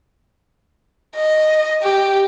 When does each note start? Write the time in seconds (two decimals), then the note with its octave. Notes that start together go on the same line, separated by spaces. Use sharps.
1.16 D#5
1.83 G4